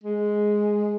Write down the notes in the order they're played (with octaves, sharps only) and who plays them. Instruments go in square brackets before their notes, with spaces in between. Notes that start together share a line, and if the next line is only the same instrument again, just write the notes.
[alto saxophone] G#3